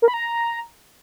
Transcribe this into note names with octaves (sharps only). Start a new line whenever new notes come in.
A#4
B5
A#5